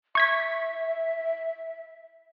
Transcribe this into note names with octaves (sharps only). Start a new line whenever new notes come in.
E5 C#6 G#6 B6